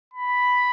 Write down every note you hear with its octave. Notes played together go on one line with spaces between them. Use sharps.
B5